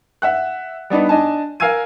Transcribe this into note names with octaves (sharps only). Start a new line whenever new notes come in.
E5 F#5 F#6
G3 B3 D4 D#4
D4 D#5 G#5 A5
A#4 F5 G#5 E6 G#6 D#7